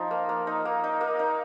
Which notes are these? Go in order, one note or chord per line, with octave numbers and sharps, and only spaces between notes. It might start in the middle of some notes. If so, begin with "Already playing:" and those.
Already playing: F3 D#4
A#3
A#3
D#4
A#3
D#4
A#3
D#4